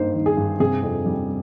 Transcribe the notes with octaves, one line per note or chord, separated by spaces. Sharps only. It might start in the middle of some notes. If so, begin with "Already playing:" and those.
Already playing: G2 D#3 A#3 D#4 C5
D#3
G#4
G2
C3 G#4
F2
G3